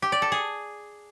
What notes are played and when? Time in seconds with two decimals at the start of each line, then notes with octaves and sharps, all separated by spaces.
0.02 G4
0.12 D5
0.22 A4
0.32 G#4